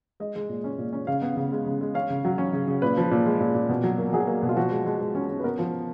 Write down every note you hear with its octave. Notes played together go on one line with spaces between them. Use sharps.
G#3 D#5
G#3
A#2
C#4
A#2
C#4
C#3 F5
B3
C#3
G#3
C#3
G#3
C#4 F5
C#3
F#3
C#4
C#3
C#3
A#2 B4
F3
A#2
G#3
A#2
A#2
B2
F#3
A#3
F#3 G#4
A#3
B2
F4
F3 F#4
G#3
G#3
G#3
C#4
C#4
B4
B3 A#4
F3